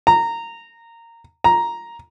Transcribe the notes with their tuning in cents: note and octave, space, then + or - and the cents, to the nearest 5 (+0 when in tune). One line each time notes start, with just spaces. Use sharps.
A#5 -15
A#5 +5